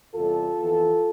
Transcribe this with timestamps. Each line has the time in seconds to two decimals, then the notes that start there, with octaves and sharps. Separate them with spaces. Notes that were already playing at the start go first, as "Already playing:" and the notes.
0.14 E2 C3 G3 F4 A4
0.57 F2 E3 B3